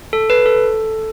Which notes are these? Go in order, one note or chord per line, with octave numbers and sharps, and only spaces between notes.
A4
B4
A4